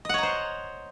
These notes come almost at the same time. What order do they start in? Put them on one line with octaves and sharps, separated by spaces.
D#5 F#5 C#5 A#5 C5